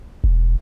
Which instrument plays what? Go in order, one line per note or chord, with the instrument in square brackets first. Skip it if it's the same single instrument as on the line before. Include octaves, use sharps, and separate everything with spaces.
[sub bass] E1